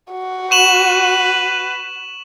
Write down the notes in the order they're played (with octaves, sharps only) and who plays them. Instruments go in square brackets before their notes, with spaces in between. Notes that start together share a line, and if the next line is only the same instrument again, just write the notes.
[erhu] F#4
[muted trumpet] B4 [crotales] C#6 E7 F#7